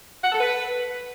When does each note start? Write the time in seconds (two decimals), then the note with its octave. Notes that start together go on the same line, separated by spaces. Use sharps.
0.24 F#5
0.32 A4
0.40 B4